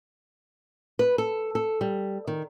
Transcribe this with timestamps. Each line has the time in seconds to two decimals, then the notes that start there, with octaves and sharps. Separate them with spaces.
0.99 B4
1.18 A4
1.55 A4
1.81 G3
2.27 D#3